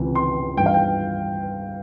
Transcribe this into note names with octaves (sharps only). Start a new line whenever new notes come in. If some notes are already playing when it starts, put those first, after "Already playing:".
Already playing: C#2 C3 E3
C6
G2 E3 G5
F5
G5